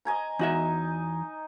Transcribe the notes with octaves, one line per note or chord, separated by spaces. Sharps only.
D#5 G#5 A#5
E2 D#4 F#4 E5